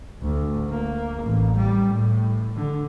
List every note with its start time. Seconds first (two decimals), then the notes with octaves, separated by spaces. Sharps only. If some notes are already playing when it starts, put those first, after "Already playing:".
0.22 D2
0.70 A#3
1.22 A1
1.57 G3
1.93 A2
2.56 D3